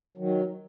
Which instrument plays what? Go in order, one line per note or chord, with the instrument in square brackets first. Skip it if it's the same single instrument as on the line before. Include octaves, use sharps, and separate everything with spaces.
[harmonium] D#3 F#3